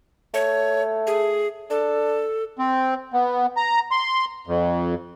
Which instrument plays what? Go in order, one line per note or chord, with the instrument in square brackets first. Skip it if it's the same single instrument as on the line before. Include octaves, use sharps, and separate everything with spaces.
[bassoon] A3 [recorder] C#5
[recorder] G#4
[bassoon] D4 [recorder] A4
[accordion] C4
B3
A#5
C6
F2